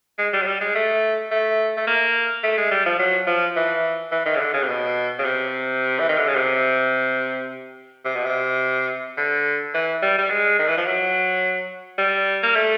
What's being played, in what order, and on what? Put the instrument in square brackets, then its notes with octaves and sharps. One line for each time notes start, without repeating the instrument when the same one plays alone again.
[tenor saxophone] G#3
G3
F#3
G3
G#3
A3
A3
A3
A#3
A3
G#3
G3
F3
F#3
F3
E3
E3
D#3
C#3
D3
C#3
C3
B2
C#3
C3
E3
D#3
D3
C#3
C3
C3
B2
C3
D3
E3
G3
G3
G#3
D#3
E3
F3
F#3
G3
A#3
A3